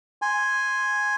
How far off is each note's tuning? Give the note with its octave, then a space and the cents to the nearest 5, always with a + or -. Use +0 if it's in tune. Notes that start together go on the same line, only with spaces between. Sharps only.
G#5 +0 C6 +0